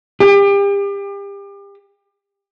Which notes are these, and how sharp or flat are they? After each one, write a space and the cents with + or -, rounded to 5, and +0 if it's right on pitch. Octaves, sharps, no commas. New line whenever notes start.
G4 +35